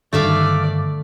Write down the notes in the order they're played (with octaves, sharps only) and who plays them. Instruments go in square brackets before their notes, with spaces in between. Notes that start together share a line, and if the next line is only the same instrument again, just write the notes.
[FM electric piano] G2 D#3 [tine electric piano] D3 [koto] A3 E5 F5 [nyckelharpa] D5